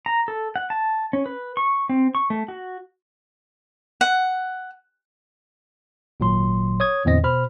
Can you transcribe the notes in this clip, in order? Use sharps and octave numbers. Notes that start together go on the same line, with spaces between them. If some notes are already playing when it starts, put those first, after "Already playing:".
A#5
A4
F#5
A5
C#4
B4
C#6
C4
C#6
A3
F#4
F#5
G#1 A#2 F#3 C6
C#5 D#6 G#6
E2 A2 D3 C4 D#5 A#6
B2 C5 B5 F6